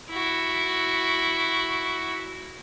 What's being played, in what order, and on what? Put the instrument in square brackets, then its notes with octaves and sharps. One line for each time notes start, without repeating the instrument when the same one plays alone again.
[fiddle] E4 F#4